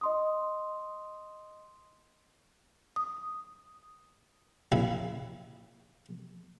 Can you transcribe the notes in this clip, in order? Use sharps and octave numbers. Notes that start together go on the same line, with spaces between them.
D#5 C6 D#6
D#6
A#1 C#3 E4